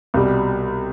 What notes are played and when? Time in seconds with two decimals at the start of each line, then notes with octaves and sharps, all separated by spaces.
0.14 C2 B2 G3